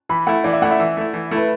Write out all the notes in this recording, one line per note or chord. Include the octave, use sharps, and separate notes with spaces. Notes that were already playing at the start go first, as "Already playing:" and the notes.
E3 B5
A3 E4 F#5
E3 D5
E5
A3 E4 F#5
E5
E3
A3 E4
E3
A3 E4 B4